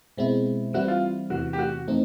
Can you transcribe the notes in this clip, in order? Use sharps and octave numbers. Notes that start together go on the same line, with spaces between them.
B2 G#3 C4 E4
E3 G3 C4 E4 F#4
F4
E2 C3 E3 F#4
G4
F#4
E3 A3 C4 D#4